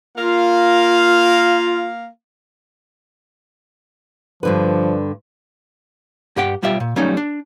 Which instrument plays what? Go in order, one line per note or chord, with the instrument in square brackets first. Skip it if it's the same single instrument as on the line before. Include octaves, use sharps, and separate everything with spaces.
[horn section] A#3 A#4 F5 [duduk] F4
[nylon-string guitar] G2 D3 B4 [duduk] F3
[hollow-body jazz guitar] G2 G4 F#5 G5
B1 G3 F4 G4 E5
A#2
F#3 G3 A3 C#4 D#4
D4